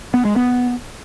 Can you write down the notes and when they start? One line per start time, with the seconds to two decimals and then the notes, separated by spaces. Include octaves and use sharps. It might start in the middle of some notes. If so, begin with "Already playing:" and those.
0.14 B3
0.25 G#3
0.36 B3